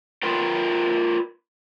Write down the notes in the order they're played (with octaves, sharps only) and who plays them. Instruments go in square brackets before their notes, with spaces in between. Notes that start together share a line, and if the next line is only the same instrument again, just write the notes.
[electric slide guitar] F4 A#4 B4 G5